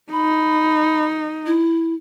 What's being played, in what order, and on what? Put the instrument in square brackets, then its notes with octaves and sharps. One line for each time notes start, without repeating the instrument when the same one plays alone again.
[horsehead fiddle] D#4 [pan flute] B5
[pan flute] E4